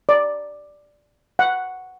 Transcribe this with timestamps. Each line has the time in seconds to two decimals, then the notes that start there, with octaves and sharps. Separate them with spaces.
0.09 D5
1.39 F#5